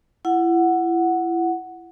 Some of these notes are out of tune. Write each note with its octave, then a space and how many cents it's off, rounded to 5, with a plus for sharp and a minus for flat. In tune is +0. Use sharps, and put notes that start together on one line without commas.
E4 +30 F#5 +0